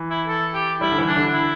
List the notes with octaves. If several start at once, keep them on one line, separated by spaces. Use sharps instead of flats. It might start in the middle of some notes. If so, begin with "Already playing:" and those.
Already playing: E3
E4
A4
G4
G3 E4
D3
E3
D4
D3
E4